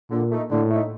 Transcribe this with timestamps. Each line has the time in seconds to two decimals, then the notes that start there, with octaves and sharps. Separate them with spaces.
0.11 A#2 D3
0.31 A3 D#4
0.51 A2 D3
0.71 A3 D#4